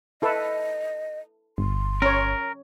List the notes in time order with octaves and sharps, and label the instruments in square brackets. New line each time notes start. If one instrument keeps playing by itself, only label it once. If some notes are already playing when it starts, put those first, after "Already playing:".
[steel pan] E4 A4 B4 [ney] D#5
[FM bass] G1 [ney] C6
[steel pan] C#4 C#5 [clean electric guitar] A#4